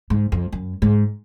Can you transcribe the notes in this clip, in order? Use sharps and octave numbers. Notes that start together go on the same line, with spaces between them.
G#2
F2
F#2
G#2